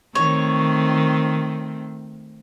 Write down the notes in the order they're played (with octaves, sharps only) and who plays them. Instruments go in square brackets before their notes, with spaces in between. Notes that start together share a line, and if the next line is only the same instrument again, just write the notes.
[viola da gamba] D#3 A3 C4 [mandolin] C#5